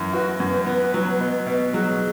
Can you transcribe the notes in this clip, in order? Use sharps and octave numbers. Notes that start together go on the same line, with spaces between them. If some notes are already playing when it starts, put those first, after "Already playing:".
Already playing: F#2 E3
F#4 B4
F#2
B3
F#3
B2
B2
F#3 G#4